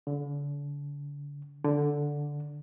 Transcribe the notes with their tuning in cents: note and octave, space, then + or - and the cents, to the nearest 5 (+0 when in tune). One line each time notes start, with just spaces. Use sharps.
D3 -35
D3 -5